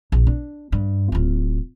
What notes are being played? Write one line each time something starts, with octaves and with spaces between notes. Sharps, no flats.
A#1
D4
G2
D1 F4